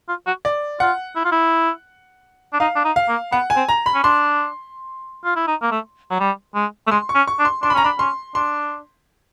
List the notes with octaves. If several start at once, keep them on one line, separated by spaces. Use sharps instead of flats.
F4
F#4
D5
F4 F#5
E4
F4
E4
D4
D#4 F5
D4
D#4
F5
A#3
B3 F#5
G#5
C4
A#5
B5
C#4
D4 C6
F4
E4
D#4
A#3
A3
F#3
G3
G#3
A3
G#3 C6
C#6
C#4
C#6
D4
C6
D4 C6
B5
C#4 A#5
D4 B5
C#4 C6
D4 C6